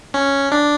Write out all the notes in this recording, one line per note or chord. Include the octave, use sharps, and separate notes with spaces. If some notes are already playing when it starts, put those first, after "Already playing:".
C#4
D4